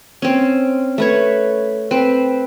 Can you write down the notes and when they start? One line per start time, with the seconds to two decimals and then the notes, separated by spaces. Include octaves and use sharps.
0.22 C4 C#4
0.98 A3 B4 C#5
1.91 C4 B4